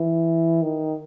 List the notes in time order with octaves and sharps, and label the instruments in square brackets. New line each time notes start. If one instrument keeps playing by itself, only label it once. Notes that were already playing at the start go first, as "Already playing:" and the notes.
Already playing: [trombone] E3
D#3